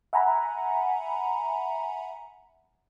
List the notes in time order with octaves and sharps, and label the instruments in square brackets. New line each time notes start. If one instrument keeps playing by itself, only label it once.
[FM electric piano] E5 F#5 G#5 A#5 B5